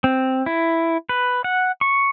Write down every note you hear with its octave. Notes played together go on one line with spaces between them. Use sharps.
C4
E4
B4
F#5
C#6